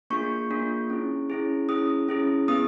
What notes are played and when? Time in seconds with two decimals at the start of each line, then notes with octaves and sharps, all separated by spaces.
0.10 A#3 D4 F4 G#4 C#6
0.51 A#3 D4 F4 G#4
0.90 C#4 E4 G#4
1.30 C#4 E4 G#4
1.69 C#4 E4 G#4 D#6
2.09 C#4 E4 G#4
2.48 B3 E4 G#4 D#6